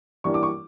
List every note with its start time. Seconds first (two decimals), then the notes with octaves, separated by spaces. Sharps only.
0.24 E3 G3 A#3 D4 C#6
0.34 D6
0.43 C#6